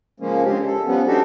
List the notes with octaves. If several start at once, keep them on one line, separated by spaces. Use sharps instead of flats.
C#3 F3 G#3 A#3 C#4
D3 G#3 C4 C#4 G4
A4
F3 G3 B3 C#4
C4 D4 D#4 F#4 G4 A4